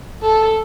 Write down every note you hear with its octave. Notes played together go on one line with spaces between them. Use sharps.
A4